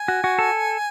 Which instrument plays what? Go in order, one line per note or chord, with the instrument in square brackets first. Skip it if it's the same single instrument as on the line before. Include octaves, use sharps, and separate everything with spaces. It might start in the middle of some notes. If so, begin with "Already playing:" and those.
Already playing: [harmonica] G#5
[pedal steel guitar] F#4
F#4
A4